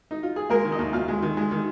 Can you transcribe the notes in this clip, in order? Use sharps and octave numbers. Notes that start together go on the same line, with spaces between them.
D#4
F4
G#4
G#3 A#3 A#4
D#3
D#4 D#5
D#2
D#2 F4 F5
G#3
D#3
G#3
D#3